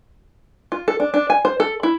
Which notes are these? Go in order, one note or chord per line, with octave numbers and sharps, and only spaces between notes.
F4
A4
D4
D4
G#5
C5
A4
E4